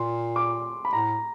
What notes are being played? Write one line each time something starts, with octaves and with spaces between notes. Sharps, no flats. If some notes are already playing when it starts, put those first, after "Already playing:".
Already playing: A#2 C6
D6
B5
A2 A#5